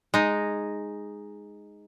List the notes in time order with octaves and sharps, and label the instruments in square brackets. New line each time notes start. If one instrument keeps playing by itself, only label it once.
[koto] G#3 D#4